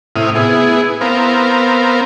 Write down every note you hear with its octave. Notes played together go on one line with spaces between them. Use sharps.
A2 C3 E4 D#6 F6
B3 E4 G#4
B3 C4 A#4 F5